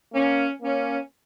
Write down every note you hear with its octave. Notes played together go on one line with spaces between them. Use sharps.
A#3 C#4
A#3 C#4